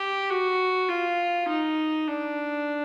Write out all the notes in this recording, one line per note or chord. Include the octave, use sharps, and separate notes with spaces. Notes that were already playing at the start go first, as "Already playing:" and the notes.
Already playing: G4
F#4
F4
D#4
D4